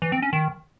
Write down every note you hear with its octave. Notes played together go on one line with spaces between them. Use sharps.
E3
C4
C#4
D#3